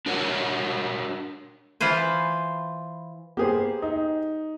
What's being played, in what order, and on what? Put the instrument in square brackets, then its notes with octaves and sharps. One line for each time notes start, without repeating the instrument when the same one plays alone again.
[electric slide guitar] D4 F#4 A#4 C#5 D5 F#5
[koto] E3 F4 B4 C5 G#5
[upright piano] A#3 B3 [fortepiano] G4 G#4 C5
[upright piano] D#4